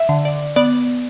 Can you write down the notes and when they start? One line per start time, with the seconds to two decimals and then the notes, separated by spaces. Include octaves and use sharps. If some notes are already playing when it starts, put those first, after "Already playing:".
Already playing: E5
0.09 D3
0.25 D5
0.56 B3 D5